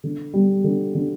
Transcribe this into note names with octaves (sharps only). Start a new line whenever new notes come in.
D3
G3
D3
D3